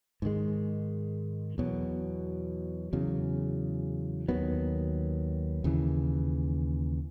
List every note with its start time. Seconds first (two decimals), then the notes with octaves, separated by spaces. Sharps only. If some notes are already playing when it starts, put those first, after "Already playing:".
0.22 G#2 D#3 G#3
1.58 E2 B2 F#3
2.93 E2 C#3 F#3
4.28 D#2 D#3 F#3 B3
5.64 D#2 C#3 E3